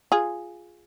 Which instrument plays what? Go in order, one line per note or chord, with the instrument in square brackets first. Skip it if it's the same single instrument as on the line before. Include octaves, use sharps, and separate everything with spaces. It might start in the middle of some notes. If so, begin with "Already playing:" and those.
[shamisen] F4 G#4